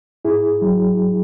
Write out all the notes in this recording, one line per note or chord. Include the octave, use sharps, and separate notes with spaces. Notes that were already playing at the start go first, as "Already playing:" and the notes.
G#2 E4 G#4
F#3